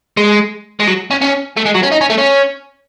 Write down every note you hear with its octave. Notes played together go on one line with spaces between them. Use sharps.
G#3
G#3
F#3
C#4
C#4
A3
G#3
F#3
C#4
D#4
C#4
A3
C#4